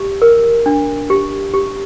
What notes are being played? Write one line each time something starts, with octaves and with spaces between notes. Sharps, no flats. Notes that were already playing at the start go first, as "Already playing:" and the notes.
Already playing: G4
A#4
D4
G4
G4